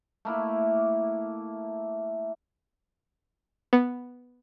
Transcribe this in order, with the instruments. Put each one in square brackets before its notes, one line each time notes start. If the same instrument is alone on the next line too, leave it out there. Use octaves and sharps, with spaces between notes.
[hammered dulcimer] A3 A#3 E4
[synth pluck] B3